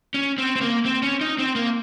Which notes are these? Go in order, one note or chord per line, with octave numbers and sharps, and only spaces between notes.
C#4
C4
C4
A#3
C4
C#4
D#4
C4
A#3